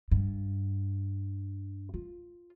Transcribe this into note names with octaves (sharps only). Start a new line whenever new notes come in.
G2
F4